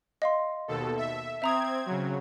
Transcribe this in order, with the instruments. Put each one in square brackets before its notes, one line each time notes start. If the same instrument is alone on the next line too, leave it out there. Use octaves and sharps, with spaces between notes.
[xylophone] D#5 F5 C6
[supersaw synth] D#2 B2 A4
E5
[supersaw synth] C4 G#6 [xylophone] E5 A#5 D#6
[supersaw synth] C#3 F#3